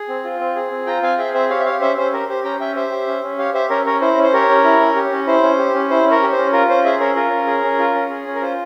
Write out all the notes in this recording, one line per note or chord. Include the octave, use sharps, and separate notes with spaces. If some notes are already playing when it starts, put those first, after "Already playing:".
Already playing: G#4
C4
F4
C4
G#4
C4
F4 G5 A#5
C4 F5 G#5
G#4 E5 G5
C4 C5 E5
G4 C#5 F5
E5
G4 C#5 F5
C#4 C5 E5
C#4 C5
G4 A#4
G4 C5
C#4 G5 A#5
C#4 E5 G5
G4 C5 E5
G4
C#4
C#4
G4 C#5 F5
G4 C5 E5
C#4 A#4 C#5
C#4 A#4 C#5
E4 C5
C#4
C5
G4 A#4 C#5
C#4
E4
C#4
G4
C#4
E4 C5
C#4
G4
C#4
E4 C5
C#4 A#4 C#5
G4
C5
C#4
F4 A#4
C#4 C5
G#4 C5 E5
C#4 A#4 C#5
F4 A#4
C#4
G#4
C#4
F4
C#4
G#4
C#4
A#4
F4 C5